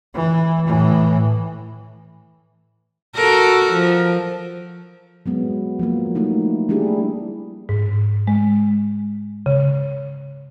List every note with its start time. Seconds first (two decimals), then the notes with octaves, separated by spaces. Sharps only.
0.14 E3
0.67 A2 E3
3.15 F#4 A4 A#4
3.72 F3
5.26 F#3 G#3 B3
5.79 F3 F#3 A#3
6.15 G3 A3 A#3 D#4 E4
6.69 G3 A3 D4 E4 G4 G#4
7.69 G#2
8.27 G#3
9.46 C#3